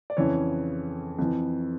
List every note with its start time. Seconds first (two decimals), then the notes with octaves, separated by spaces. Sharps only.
0.10 D5
0.17 F2 C#3 E3 C#5
1.18 F2 E3